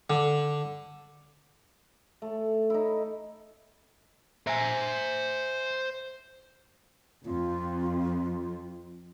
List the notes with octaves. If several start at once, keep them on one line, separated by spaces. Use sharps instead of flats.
D3
A3
D#4 E4
C5 E5 G#5 A#5
F2 F4